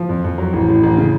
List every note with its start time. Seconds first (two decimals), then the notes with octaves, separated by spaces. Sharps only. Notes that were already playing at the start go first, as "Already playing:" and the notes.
Already playing: F3
0.09 F2
0.24 F2
0.38 F#3
0.53 A1
0.68 A2
0.83 A1
0.97 C#3